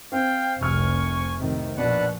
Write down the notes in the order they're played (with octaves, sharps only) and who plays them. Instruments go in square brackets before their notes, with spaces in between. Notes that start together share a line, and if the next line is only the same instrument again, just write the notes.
[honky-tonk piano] C4 [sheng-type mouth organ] F5 [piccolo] G5
[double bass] F1 C2 [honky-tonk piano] C3 F6 [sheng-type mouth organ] G#5 [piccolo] C#6
[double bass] A2 D#3 [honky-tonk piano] C3
[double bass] A#1 [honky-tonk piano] B2 [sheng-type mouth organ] D4 B4 F#5 [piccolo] F#6